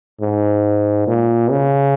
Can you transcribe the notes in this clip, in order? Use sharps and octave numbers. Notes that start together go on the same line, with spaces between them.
G#2
A#2
C#3